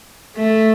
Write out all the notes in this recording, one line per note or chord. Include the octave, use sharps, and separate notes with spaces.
A3